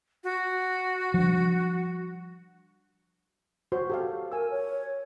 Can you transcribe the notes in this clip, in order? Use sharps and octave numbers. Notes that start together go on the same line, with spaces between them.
F#4
F3 G3 D4
F#4 C5 C#5
G4 A4 F5
A#4 G#5 E6
C#5